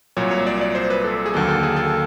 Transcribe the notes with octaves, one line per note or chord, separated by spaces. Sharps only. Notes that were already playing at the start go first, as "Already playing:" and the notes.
C2 A#2 F#3 C#5
C#5
D5
D5
C5
B4
A4
G#4
D#2 D3 F#3 A#3 A4
A4
G#4
A4